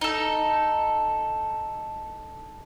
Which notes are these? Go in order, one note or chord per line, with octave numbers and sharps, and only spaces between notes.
D#4 A4